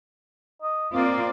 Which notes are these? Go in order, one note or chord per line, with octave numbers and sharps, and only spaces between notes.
D#5
A#3 C4 F4 D5